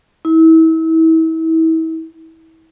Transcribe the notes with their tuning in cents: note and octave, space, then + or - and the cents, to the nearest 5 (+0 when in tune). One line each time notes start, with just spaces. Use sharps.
E4 -35